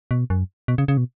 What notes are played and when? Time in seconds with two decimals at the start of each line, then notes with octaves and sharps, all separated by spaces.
0.11 B2
0.30 F#2
0.68 B2
0.78 C#3
0.88 C#3
0.97 B2